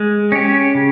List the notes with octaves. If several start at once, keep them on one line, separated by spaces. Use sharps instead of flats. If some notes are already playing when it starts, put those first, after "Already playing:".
Already playing: G#3
C#4 G4
C#3